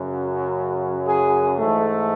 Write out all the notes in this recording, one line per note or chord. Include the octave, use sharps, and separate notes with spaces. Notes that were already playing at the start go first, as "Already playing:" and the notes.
Already playing: F#2 C#3 F#3
G#4
G#2 E3 A3